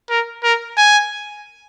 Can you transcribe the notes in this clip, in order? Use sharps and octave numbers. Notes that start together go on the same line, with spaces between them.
A#4
A#4
G#5